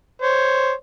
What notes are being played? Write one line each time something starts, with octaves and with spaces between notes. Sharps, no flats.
C5 C#5